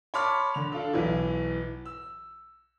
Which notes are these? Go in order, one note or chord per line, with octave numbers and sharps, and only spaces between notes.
C#5 A5 B5 C6 D6 F6
D3 F7
D4 F4 A4
B1 E3
E6